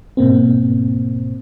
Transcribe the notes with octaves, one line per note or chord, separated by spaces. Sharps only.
G#2 B2 A#3 C4